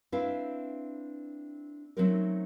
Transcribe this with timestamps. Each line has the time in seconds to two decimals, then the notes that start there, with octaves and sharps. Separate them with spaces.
0.12 C4 D4 E4 B4 E5 F5
1.97 F#3 A3 C4 C#4 D#4 A#4